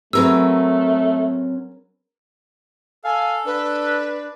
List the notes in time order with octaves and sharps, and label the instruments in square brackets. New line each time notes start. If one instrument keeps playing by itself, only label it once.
[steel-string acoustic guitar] F#3 C4 C#4 [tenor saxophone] A3 [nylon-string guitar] G#4 A#4 B4 [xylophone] E6
[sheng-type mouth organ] A4 [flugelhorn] F5 [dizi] G#5
[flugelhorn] D4 [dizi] B4